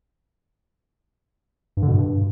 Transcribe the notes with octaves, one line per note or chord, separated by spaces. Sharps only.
G2
D3
B2
G2